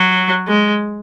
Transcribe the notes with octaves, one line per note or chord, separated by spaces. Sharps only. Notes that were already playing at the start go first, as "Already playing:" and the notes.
Already playing: F#3
G#3